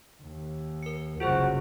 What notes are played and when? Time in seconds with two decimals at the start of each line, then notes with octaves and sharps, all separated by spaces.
0.23 D#2
0.83 A#4 C#7
1.20 F#1 C2 F4 F#4 G#4 C5